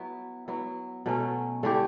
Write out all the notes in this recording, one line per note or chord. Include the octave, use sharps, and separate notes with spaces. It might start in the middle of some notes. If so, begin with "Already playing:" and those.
Already playing: F#3 B3 E4
F#3 B3 E4
B2 F#3 A3 C#4
D3 A3 E4 G4